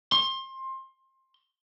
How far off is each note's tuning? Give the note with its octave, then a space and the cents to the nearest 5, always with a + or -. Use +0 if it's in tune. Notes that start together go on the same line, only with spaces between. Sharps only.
C6 +25